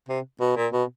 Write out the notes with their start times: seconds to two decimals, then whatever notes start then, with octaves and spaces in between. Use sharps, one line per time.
0.09 C3
0.41 B2
0.57 A#2
0.73 B2